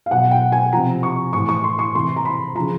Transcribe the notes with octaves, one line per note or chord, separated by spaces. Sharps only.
F5
B2 F#3 F#5
G5
G#5
C3 F3 A#5
C#6
A2 E3 C#6
C#6
C6
C#6
C3 E3 C6
A#5
B5
C#3 F3 A#5